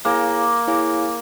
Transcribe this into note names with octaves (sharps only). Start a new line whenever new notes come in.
A#3 E4 G#4 C#5 F5 G#5
E4 G#4 C#5 F5 G#5